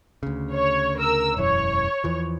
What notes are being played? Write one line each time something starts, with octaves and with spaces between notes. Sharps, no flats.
D2 C#3
C#5
A#4 E6
E1 F#2 E3 C#5
E2 E3 F3